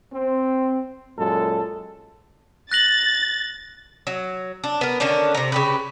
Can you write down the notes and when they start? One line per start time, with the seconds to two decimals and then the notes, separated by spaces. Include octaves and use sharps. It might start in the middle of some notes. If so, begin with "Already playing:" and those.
0.13 C4
1.17 F#2 A#2 G#3 A4
2.71 F#6 A6 A#6 F#7
4.07 F#3
4.64 D4
4.81 B3 A#4
5.00 D3 D#3 C#4 D4
5.35 C3 A#5
5.52 C#3 G4 B4